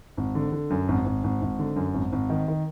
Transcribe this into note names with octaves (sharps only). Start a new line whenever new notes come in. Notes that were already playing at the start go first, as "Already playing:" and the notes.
G#1
D3
D3
F#2
G#1
G#1
G#1
G#1
D3
F#2
G#1
G#1
D#3
D#3